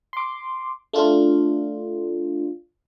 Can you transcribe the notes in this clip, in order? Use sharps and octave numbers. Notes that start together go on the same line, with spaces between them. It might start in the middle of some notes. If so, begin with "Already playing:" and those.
C6 D6
A3 D4 F4